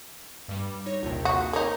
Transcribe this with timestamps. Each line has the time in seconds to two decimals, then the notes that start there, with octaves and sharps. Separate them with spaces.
0.48 G2 G3
0.86 D#4 C#5 A#6
1.03 A#1 D#2 C3
1.25 F#4 D#6
1.53 A#3 D#4 C#5 G#5